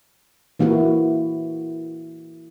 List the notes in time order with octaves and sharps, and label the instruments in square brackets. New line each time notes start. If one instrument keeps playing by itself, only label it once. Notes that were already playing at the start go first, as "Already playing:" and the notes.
[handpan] E3 A#3 E4 F#4